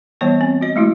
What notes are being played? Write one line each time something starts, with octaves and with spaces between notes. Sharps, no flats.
E3 G3 B3 C#5 A5
C4
F#4 D#5
G#3 A3 E4 F#4